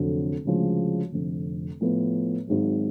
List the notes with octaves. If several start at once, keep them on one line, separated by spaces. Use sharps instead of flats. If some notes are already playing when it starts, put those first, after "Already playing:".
Already playing: F1 F2 D3 F#3
D2 C#3 F3 G#3
F1 F2 D3
A2 F3 B3
G#1 G#2 F#3